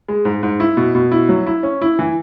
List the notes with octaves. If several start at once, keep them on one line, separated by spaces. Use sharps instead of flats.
G#3
G#2
G#2
E4
B2
B2
E4
F#3
E4
C#4
E4
E3